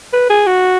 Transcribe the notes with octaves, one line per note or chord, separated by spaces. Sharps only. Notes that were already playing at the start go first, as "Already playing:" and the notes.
B4
G#4
F#4